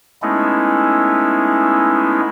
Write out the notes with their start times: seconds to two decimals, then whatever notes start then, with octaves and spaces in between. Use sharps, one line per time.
0.22 G#3 A3 B3 C#4 D#4 E4